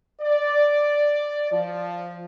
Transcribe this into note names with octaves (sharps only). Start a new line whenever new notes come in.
D5
F3